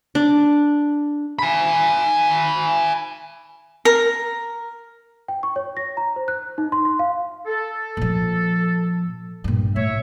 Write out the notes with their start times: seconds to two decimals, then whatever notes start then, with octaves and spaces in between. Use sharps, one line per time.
0.15 D4
1.39 G#5 B5
3.85 A#4
5.28 G5
5.43 C#6
5.56 C#5
5.77 A#6
5.97 A#5
6.16 C5
6.28 F#6
6.58 D#4
6.72 C6
6.85 C6
6.99 F5
7.46 A4
7.97 A#2 F3
9.44 G2 A#2
9.76 A2 C#5 E5